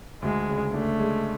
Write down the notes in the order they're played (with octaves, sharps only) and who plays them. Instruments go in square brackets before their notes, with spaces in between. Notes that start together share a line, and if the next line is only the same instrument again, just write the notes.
[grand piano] D2 [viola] G#3
[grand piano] C#3
[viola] A3 [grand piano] D4
[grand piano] G#3